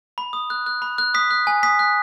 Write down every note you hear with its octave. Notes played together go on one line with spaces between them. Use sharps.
B5
D#6
F#6
F#6
B5
F#6
D#6 B6
F#6
G#5
D#6 B6
F#6